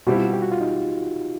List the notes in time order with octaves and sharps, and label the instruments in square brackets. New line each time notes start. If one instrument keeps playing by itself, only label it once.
[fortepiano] B2 G3 C4 E4 [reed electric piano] F#4
[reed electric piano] F4
F#4
G4
F#4
F4
D#4